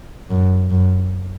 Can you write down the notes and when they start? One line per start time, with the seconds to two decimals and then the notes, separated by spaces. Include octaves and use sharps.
0.30 F#2
0.71 F#2